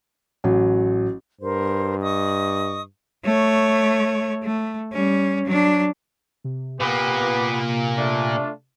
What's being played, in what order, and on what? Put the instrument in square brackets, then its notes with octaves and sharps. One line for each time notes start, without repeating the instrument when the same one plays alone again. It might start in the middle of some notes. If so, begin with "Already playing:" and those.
[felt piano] A1 F#3
[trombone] G2 [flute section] A#4 C5
[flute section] D#5 C#6 D#6
[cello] A3 C#5
A3
G3 C#4
F#3 D4
[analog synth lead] C3
[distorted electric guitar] A#2 A#3 [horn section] B3 G4 B4
[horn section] A3 D4 F4